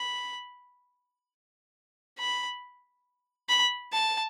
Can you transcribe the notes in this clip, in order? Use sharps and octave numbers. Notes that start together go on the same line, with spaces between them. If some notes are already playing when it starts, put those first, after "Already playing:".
Already playing: B5
B5
B5
A5